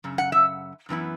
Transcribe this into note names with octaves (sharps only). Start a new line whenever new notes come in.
F#2 C#3
F#5
E5
F#2 E3 B3 E4